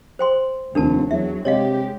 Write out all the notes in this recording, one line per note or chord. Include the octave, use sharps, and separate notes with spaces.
C5 G5 C6
F1 D#2 D4 A#4 A5
E2 F#3 E5
C3 G#3 G4 C#5 D#5 F5